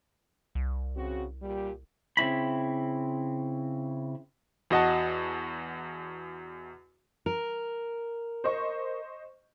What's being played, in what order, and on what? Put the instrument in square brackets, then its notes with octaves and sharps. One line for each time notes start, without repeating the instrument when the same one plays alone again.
[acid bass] C2
[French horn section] C#3 C4 F#4
A#2 G3 G4
[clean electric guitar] C#3 C4 E4 B5
[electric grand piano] E2 F#4 D#5 F#5 A5
[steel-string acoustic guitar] A#4
[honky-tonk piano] C5 D#5 C#6